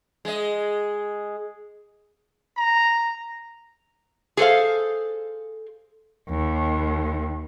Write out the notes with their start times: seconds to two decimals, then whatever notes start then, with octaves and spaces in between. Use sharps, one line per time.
0.25 G#3 D#5
2.57 A#5
4.37 G#4 A4 C5 F5
6.30 D#2